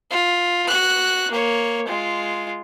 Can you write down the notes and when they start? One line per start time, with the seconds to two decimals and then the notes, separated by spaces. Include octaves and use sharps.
0.11 F4
0.68 F#4 F#6
1.31 A#3 C#5
1.87 G#3 F4